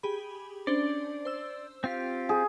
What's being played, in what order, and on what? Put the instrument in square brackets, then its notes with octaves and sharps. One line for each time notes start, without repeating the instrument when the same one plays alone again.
[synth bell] G4 G#4 B5
[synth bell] C#4 D4 C5 [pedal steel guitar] D5
[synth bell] C5 E6
[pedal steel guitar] C4 F4 G4 [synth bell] F5
[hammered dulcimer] G#4